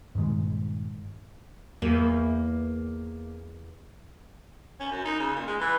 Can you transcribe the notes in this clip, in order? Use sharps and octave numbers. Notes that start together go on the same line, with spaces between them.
G2 A#2 D#3 G#3
E2 A#3
C#4
F#2
D#4
C#3
A#2
G#3
E3